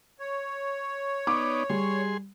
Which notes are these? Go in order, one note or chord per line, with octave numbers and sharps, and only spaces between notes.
C#5
B3 D#4 D5 D6
G3 G#4 C6